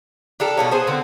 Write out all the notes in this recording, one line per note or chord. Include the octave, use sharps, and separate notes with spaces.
D4 G4 A4 A#4
B2 G3 C#4
B3 G#4 C5
D3 C4